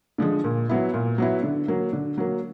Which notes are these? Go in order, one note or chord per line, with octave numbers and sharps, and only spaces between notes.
D3 F3 G#3
A#2
F#3 B3 E4
A#2
F#3 B3 E4
D3
F#3 A#3
D3
F#3 A#3